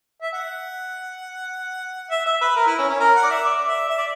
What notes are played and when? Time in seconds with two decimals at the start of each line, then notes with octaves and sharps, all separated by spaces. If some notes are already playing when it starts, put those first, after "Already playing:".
0.22 E5
0.33 F#5
2.11 E5
2.26 E5
2.41 B4
2.56 A#4
2.67 E4
2.78 C#4
2.89 C#4
3.00 A#4
3.15 F#5
3.23 D5
3.30 E5
3.44 D5
3.67 E5
3.89 E5
3.98 D5